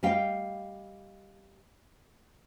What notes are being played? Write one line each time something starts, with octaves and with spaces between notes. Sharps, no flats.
G3 D#5 F5 G5